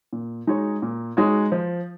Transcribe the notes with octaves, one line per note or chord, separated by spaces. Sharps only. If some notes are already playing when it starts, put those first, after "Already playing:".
A#2
G#3 D#4 F#4 C#5
A#2
G#3 D#4 F#4 C#5
F3